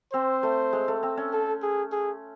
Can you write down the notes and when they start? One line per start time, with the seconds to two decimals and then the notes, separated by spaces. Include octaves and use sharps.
0.13 C4 C5
0.43 A3
0.73 G#3
0.88 A3
1.03 C4
1.17 C#4
1.33 A4
1.63 G#4
1.92 G#4